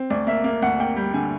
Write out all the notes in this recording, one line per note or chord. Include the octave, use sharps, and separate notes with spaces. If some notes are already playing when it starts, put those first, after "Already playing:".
Already playing: C4
D2 D5
A#3 E5
A#3
D2 F#5
A#3 G5
G3
D3 G#5